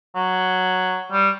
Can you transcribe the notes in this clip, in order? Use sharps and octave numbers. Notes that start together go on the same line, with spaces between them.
F#3
G3